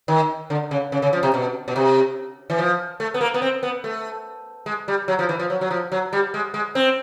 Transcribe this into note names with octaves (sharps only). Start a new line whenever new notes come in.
D#3
D3
C#3
C#3
C#3
F3
C3
B2
B2
C3
E3
F3
A3
B3
A#3
B3
C4
B3
A3
G#3
G3
F#3
F3
E3
F3
F#3
F#3
F3
F#3
G3
G#3
G#3
C4